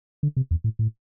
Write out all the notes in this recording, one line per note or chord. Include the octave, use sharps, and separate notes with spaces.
D3
C3
E2
A2
A2